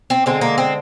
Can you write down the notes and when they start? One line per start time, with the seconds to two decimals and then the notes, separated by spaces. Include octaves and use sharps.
0.10 C4
0.26 D3 G#3 C4
0.41 A#3
0.58 C4